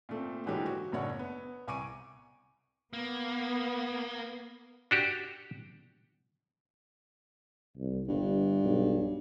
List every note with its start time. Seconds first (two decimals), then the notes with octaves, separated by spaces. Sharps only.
0.09 A#2 A3 C4
0.46 G#2 D3 E3 F#3 G#3 G4
0.66 F#4
0.92 F#1 A2 D4 C#5 F#5
1.19 B3
1.67 C2 G#5 C#6 D6 D7 D#7
2.93 A#3 B3
4.91 D4 F#4 G4
7.77 C2
8.08 G1 G2
8.64 B1